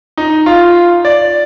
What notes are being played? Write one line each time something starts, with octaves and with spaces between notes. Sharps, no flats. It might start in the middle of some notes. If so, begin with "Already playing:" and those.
D#4
F4
D5